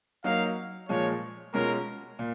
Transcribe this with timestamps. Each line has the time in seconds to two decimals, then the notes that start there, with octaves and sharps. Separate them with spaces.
0.24 F#3 A#3 D#4 F#4 F5
0.89 A#2 F3 G#3 C#5
1.54 B2 G#3 C#4 F4 A#4
2.19 A#2